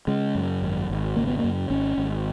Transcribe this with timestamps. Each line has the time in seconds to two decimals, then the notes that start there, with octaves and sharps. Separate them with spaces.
0.07 C#3 G#3
0.35 F#2
0.62 G#1
0.90 G#1
1.16 C#3 A#3
1.27 B3
1.39 A#3
1.44 F#2
1.70 G#1 C#4
1.98 G#1